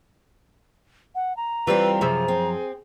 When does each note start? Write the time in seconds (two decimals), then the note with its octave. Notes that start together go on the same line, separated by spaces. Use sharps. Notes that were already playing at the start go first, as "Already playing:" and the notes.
1.15 F#5
1.37 A#5
1.67 E3 G3 C4 F4 B4
2.01 F#2 C3 F3 G#4 E5
2.28 C4